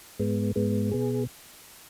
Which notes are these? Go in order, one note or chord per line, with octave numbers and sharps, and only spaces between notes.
G#2 G#3 B3
G#2 G#3 B3
B2 B3 G#4